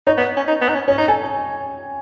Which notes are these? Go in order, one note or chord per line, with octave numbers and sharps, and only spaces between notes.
D#4 C#5
B3
C#4
D#4
B3
D#4
C#4
C#4 C#5
D#4
A4 G#5